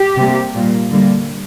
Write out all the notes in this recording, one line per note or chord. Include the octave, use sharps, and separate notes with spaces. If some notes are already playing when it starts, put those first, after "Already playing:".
Already playing: G4
C3 G3 A#3
A#2 G3 A#3
D3 G3 A#3